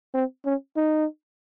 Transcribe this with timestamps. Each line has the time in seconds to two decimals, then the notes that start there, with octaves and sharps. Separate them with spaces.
0.14 C4
0.45 C#4
0.77 D#4